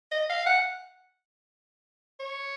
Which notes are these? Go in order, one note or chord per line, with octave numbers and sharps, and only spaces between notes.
D#5
F5
F#5
C#5